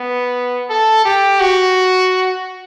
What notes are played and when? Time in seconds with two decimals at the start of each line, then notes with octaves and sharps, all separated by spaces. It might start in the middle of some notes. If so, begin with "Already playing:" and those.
Already playing: B3
0.70 A4
1.05 G4
1.40 F#4